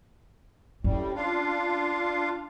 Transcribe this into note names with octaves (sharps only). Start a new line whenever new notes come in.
A2 G3 C#4
D4 F4 F5